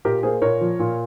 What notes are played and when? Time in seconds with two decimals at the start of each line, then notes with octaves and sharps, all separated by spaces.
0.05 A#2 G4 A#4
0.23 A#3 G#4 C5
0.42 A#2 A#4 C#5
0.61 F3
0.80 A#2